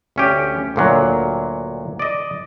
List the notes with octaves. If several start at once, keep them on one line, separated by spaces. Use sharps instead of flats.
D2 C#4 G4
D2 A#2 F#3
D5 D#5